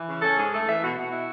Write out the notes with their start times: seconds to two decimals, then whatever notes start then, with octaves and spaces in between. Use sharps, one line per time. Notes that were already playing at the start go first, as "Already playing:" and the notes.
Already playing: E3
0.08 C#3
0.22 C#4 A4
0.37 G#2 G#4
0.52 A3 A4
0.67 E3 E5
0.82 B2 F#4
0.96 B2 F#4
1.11 E4